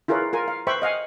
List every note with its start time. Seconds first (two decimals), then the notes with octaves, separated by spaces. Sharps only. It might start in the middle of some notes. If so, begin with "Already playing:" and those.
0.08 E4 F4 G#4 A#4 B4 C#5
0.33 F4 A#4 G#5
0.48 F5
0.67 B4 C5 E5 G5 B5 C#6
0.82 D#5 F5 F#5 G#5